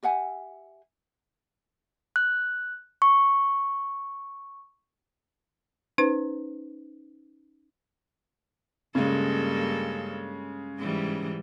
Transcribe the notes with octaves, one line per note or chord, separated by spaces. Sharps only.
G4 E5 F#5 G#5
F#6
C#6
C#4 D#4 B4 C5
G2 C#3 G#3 A#3 A4
G#2 E3 G3